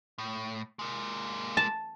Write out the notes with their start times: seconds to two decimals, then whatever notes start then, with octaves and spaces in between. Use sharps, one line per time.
0.18 A2
0.79 G#3 A#3
1.57 A5